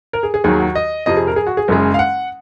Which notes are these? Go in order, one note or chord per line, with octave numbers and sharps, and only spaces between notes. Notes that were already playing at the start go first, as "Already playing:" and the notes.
A#4
G#4
G#4
D#2 D#3 F#3 G#4
F#4
D#5
F2 C3 F3 D#5
G#4
A#4
G#4
F#4
G#4
F#1 F#2 C#3 G#3
F5
F#5